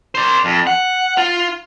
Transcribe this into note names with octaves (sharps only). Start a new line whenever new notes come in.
C5 D5
F2
F#5
F4